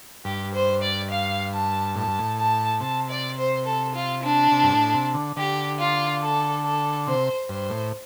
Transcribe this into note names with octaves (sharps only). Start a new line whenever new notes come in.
G2 G4
C5
D5
F5
A5
A2 A5
G2
A2
A5
C3 A5
D5
C5
A4
F4
D4
C3
G2
A2
C3
D3
D3 G4
F4
A4
A4
C3 C5
G2 C5
A2